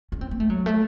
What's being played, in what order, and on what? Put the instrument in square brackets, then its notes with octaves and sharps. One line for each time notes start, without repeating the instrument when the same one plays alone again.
[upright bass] C#4
C4
A#3
A3
F#3
A3